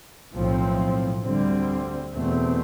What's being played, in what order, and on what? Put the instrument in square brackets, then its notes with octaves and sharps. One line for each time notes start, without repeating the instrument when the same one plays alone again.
[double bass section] B1 A2 F3 C4
D2 D3 G3 C4
E2 B2 A3 C4